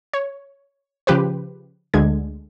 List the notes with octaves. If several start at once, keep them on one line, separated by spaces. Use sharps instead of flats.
C#5
C#3 F3 G4 B4 C5
D2 D3 G#3 G#6